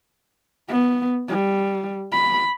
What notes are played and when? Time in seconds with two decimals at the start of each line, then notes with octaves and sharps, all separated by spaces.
0.68 B3
1.29 G3
2.12 B5